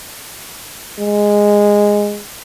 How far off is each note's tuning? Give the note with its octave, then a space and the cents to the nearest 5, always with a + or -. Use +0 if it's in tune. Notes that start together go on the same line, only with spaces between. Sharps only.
G#3 -10